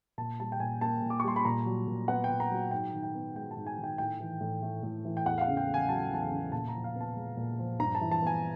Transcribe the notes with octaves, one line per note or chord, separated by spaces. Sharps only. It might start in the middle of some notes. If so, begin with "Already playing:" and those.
A#2 A5
G3 A5
G5
A#2 G#5
A#3 A5
A#2
D6
C#6
G3 C6
B5
A#2 A#5
F#3
A#2
B3 F#5
G5
A#2
A#5
F#3
G#2 G5
D#3
G5
B3
G#3 G5
A5
G#2
G#5
D#3
G5
A2 G5
E3
A2
A3
A2
E3
G5
E2 F#5
F5
F#5
C#3
G5
A3
G#5
F#3 A5
E2 A5
G#5
C#3
A#2 A5
A#5
F3
F5
B3
A5
G#3
A#2
F3
G2 A#5
A5
E3
A5
B3 G#5